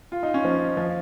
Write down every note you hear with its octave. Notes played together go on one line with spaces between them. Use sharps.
F4
D#4
C#4
F3
F3